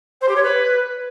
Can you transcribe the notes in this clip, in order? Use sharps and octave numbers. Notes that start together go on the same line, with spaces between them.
C5
G4
C#5
B4